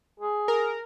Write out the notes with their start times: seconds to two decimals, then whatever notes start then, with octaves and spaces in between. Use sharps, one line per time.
0.20 G#4
0.48 A#4